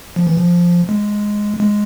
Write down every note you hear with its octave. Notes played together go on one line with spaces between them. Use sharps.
F3
E3
F3
G#3
G#3